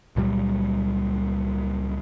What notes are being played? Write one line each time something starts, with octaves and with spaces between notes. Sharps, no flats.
C#2 A#2 F#3 G3